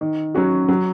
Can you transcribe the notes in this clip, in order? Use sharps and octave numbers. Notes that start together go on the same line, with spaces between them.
D#3
F#3 C#4 F#4
F#3